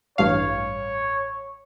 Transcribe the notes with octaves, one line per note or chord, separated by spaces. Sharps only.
A1 G2 C#5 F5